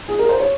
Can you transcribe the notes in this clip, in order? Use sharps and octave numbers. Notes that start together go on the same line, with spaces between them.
G#4
A#4
C5
C#5